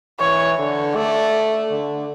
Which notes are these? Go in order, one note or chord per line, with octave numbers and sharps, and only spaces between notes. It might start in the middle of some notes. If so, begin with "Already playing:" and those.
E3 C#5
D3
A3 D5
D3